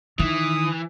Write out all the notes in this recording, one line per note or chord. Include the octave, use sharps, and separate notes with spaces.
D#3 E3 D#6